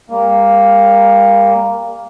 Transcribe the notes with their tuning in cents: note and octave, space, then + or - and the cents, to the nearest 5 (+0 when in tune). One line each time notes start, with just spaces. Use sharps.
G3 +40 A#3 +0